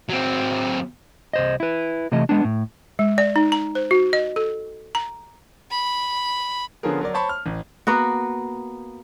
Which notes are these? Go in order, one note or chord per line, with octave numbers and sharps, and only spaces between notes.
F#3 C4
C2 C5 D#5
E4 B4
C3 E3 A3 D#5
G#3 B3 D4
A2
G#3
D5
D#4
A#5
C5
F#4
D#5
A4
A#5
B5
D3 F3 B3 C#4 G#4 A#4
F#3 A#4 D5
C5 C#5 A5 B5 C#6
F6
A1
A#3 B3 F#4